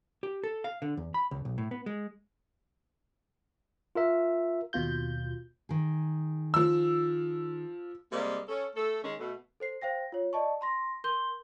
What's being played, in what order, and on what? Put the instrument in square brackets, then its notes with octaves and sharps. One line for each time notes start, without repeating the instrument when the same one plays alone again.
[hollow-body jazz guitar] G4
A4
F5
D3
E2
B5
C#2
B1
A2
B3
G#3
[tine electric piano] F4 A#4 E5
[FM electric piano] D#2 B2 F4 G6
[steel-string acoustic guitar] D#3 G#4
[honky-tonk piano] F3 E6
[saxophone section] C3 G3 G#3 A#3
C#4 A4
A3 A4
D#3 G#3 C#4
B2 A3
[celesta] A4 C5 C7
C5 F5 G5 A#6
F4 C#5
D5 D#5 A5 C#6
A#5 C6 A#6
A#4 C6 G6 G7